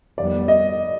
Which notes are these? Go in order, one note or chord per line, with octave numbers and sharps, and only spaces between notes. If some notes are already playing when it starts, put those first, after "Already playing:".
F2 D#3 G3 B3 D5
D#5